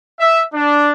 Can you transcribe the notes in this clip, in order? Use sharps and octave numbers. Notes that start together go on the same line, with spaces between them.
E5
D4